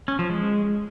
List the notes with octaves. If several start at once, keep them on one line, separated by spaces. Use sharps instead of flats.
C#4
F3
G#3